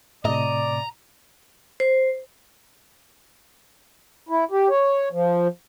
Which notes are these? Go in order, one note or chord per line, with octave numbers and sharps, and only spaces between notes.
A2 C3 D5 D#5 A#5
C5
E4
G4
C#5
F3